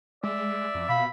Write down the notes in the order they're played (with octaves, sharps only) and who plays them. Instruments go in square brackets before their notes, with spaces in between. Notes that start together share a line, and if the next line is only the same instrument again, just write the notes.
[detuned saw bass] G#3 [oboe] D5 [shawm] E5
[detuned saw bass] F2
[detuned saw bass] B2 [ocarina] F5 [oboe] B5